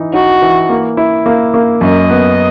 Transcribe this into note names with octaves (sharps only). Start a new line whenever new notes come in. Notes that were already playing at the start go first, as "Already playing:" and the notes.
Already playing: E3 D#4
D#4 F#4
E3
A#3
E4
A#3
A#3
F#2 D#5
B3